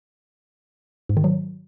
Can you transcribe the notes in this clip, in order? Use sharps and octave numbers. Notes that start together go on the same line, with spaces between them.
G#2
D#3
F#3